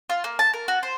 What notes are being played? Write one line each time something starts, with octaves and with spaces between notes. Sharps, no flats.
F4
A#3
A5
A#4
F#4
C5